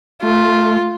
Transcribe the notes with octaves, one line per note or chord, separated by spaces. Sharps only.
A3 F4